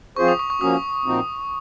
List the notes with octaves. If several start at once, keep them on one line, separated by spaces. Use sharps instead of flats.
F3 C4 F4 G#4 C5 C#6
D#6
C#6
C#6
F3 A#3 C#4 F#4 D#6
A#2 F3 C4 D#4 F#4